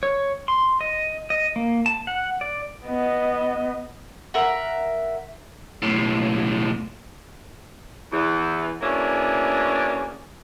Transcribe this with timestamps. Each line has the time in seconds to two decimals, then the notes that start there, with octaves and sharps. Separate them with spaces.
0.03 C#5
0.48 C6
0.81 D#5
1.30 D#5
1.56 A#3
1.86 A5
2.07 F#5
2.41 D5
2.86 B3 D#5
4.34 A#4 E5 F#5
5.82 B1 A2
8.12 E2 E3
8.81 B2 A#3 C#4 D4 E4 G#4